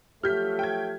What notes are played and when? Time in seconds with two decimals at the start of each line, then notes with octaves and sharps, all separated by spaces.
0.23 F3 F#3 A3 G4 F6 G6 B6
0.59 G5 G#6